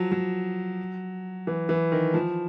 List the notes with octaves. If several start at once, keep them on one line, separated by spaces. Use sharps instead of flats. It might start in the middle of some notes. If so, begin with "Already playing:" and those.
Already playing: F3 F#3
F#3
E3
E3
D#3
F3